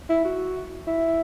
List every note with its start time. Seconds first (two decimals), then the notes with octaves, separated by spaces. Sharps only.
0.10 E4
0.25 F#4
0.87 E4